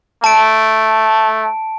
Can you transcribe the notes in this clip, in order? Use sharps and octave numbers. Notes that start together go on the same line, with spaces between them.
A3 A5 D7